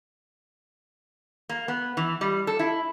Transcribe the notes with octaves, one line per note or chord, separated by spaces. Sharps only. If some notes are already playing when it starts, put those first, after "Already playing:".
A#3
B3
E3
G3
A4
E4